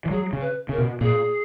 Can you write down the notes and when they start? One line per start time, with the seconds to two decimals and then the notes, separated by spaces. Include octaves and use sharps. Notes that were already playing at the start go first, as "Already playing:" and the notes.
0.06 E3
0.11 F#3 G#4
0.33 C#3
0.41 B4
0.69 C#3 A#4
0.78 B2
1.01 A#2 G#4